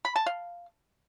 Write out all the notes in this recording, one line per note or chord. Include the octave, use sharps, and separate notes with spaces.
B5
A5
F5